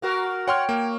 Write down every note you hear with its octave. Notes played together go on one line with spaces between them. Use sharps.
A#3 F#4 A#4
C#5 F#5 G5 C6 F6
A#3